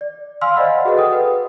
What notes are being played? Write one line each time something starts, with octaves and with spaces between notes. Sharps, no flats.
D5
F5 G#5 C6 E6 F6
C5 D5 D#5 F5 F#5 B5
F#4 G#4 B4 D#5 F#5
A4 G5 D#6
B4